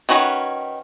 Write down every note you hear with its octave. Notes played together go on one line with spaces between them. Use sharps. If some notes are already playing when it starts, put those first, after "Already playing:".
D#3 C#4 F#4 B4